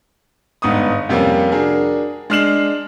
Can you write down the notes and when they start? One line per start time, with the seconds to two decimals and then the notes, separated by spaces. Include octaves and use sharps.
0.62 G1 G#2 B3 C#6 D#6
1.09 F2 C3 G3 A#3 C#4
1.52 D4 F#4 G#4 A#4
2.30 G#3 D4 F6 C7 E7 F#7